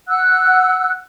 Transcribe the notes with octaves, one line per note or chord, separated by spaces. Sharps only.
F#5 E6 F#6